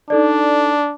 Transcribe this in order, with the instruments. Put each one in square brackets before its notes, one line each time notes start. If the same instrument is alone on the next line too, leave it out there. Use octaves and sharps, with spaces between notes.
[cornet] D4 [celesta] D#4 A4 D5